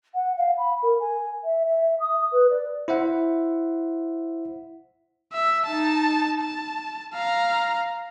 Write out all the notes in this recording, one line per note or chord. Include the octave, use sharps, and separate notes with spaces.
F#5
F5
B5
A#4
G#5
E5
E5
D#6
B4
D5
E4 C5 E5 F#5
E5
D#4 A5
A5
F5 A#5